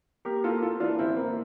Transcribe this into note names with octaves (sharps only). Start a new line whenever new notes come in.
A#3 G4 A#4
A#3 F4 A4
A#3 F4 A4
E3 D4 F4
A1 C4 E4
A#3